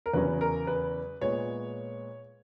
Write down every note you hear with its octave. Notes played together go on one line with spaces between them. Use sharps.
A#4
E2 C#3 F#3 C#4 B4
A#4
B4
A#2 G#3 B3 C#5